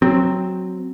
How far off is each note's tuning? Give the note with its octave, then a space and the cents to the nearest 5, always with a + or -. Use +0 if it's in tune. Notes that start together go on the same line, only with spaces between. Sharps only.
F#3 +0 C4 +0